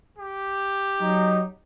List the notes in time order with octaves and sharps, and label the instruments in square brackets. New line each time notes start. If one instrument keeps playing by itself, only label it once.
[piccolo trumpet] G4
[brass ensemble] F#3 D#4